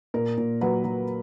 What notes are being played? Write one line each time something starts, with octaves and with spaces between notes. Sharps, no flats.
A#2 A#4
A#2
F#3 B4
F#3